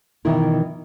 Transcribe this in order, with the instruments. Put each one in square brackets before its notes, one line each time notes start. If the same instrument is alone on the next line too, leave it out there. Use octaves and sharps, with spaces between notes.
[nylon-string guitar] B2 D#3 E3 E4 A#4